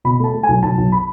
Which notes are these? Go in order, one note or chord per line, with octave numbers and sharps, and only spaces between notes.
B2 B5
A3 A5
A3
B1 G#5
B1 A5
B1
B5